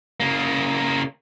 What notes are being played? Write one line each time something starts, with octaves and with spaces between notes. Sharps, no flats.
C#3 A#3